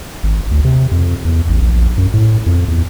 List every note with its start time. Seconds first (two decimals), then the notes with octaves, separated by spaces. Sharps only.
0.23 G#1
0.51 D2
0.65 C3
0.91 F2
1.25 E2
1.49 A1
1.61 A#1
1.98 F#2
2.14 A2
2.46 F2
2.68 E2